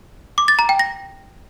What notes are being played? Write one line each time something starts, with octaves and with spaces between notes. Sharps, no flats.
D6
A6
A#5
G5
A#6